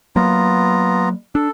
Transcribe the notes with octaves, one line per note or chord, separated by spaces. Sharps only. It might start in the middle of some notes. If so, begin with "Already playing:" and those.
F#3 A#3 B3 F4 A#5
D4 A4